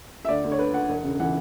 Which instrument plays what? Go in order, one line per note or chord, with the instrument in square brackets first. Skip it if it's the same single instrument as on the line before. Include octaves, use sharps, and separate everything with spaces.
[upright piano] E5
D2 D5
D2
C#5
D3 B4
D3 F#5
E1
C#3
E3 F#5